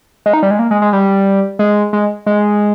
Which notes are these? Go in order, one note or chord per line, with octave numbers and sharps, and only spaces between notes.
G#3
D#4
G3
G#3
A#3
G#3
G#3
G3
G#3
G#3
G#3